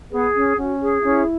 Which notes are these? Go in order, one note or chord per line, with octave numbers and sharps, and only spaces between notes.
B3 G#4
C#4
C#4 F#4
G#4
C#4 E4